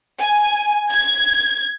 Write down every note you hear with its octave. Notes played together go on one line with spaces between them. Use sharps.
G#5
G#6